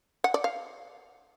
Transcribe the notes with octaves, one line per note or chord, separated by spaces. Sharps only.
F#5
D5
F5